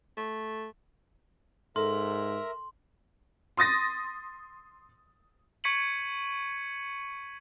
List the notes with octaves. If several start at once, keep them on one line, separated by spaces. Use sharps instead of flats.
A3
G#2 A4 A#4 E5 A#5 C6
C6 D#6 A6 A#6
C#6 G#6 B6 C#7 D#7 F#7